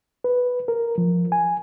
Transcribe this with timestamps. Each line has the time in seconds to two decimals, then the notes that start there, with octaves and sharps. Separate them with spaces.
0.24 B4
0.68 A#4
0.98 F3
1.32 G#5